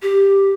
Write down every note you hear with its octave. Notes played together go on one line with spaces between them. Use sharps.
G4